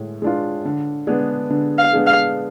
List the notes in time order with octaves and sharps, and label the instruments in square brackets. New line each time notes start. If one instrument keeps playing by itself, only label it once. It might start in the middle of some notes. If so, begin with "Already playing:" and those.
Already playing: [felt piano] A2 G#3
G#3 D4 F4
D3
G#3 B3 D4 G#4
D3
[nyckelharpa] F5
[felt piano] G#3 B3 D4 G#4
[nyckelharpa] F5